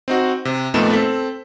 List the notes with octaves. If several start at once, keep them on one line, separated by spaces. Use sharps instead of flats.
C4 D#4 F#4
C3
F2 A#2 A3 B3 D#4 E7
C4 A4 B6